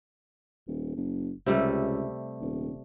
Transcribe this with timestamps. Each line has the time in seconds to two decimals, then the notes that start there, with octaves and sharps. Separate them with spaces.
0.67 D#1
0.96 F#1
1.46 C#2 C3 G3 A3
2.41 D#1